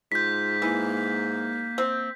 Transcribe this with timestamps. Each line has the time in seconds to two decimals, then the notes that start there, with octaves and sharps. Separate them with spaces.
0.12 G#2 F4 G6 B6
0.62 E3 A#3
1.78 C4